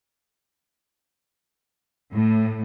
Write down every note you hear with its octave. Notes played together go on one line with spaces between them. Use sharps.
A2